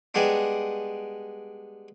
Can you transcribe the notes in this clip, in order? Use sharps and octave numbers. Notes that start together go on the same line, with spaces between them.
G3 G#3 B3 D4